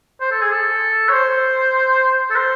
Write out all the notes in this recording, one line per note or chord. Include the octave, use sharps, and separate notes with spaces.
C5
A4
G#4
A4
C#5
C5
A4
C5